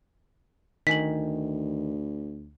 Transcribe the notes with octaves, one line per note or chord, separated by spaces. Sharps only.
D2 D#3 G#5 B6 F#7